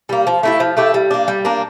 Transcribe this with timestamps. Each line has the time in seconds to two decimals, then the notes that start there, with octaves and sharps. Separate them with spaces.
0.09 G3 A#3
0.27 F3
0.43 A3 E4 G4
0.60 F3
0.77 A3 E4 G4
0.94 G3
1.11 A#3 D4
1.28 G3
1.45 A#3 D4